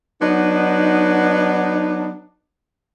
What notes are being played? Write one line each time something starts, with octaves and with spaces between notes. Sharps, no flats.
F#3 B3 D4 D#4